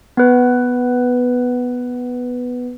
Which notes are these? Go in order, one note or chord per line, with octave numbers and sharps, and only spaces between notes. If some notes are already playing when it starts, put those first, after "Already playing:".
B3 B4